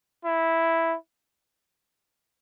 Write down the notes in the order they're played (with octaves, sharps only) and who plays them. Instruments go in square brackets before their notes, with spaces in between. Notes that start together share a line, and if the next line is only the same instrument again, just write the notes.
[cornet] E4